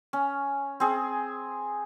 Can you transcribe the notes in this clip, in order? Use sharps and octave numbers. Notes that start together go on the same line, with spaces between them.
C#4
C4 G#4